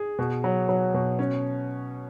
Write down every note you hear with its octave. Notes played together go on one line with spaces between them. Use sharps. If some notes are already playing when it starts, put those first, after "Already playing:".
Already playing: G#4
B2
F#3
F#3
B2
C#4